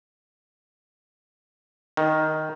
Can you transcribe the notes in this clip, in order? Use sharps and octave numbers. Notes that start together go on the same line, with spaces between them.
D#3